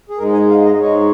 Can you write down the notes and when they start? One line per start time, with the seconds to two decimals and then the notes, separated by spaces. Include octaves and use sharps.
0.10 G#4
0.18 G#2 G#3 D#4 A#4
0.33 G#5
0.50 F5
0.65 D#5
0.81 G#2 G#3 D#4 C#5